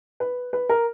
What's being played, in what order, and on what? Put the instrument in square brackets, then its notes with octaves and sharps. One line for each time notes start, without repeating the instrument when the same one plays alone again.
[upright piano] B4
B4
A#4